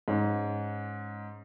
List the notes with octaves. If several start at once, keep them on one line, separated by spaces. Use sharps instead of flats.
G#2 C#4